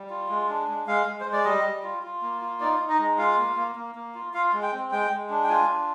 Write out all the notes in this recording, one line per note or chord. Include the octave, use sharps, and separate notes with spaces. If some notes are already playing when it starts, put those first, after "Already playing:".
Already playing: G3
F4
G#3
D4
G#3
G#3 F5
G#3
C5
G#3
D5
G3 D#5
G3
F4
F4
A#3
F4
D#4 D5
D#4
D#5
G#3
F4 F5
A#3
A#3
A#3
A#3
F4
F4 F5
G#3
G5
C4
G#3 G5
G#3
D4
G5
F4 G#5
D4